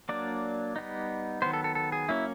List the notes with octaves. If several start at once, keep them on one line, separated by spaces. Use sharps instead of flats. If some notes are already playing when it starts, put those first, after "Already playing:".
F#3 A#3 D4 D5
G3 B3 D#4
D#3 F#3 B3 C5
A4
A4
A4
G#4
F#3 A#3 C#4 E4